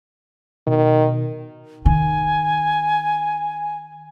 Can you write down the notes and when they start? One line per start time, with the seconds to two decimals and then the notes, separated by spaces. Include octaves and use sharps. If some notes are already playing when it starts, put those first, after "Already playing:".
0.67 B2 D#3
1.85 D#3 D#4 G#5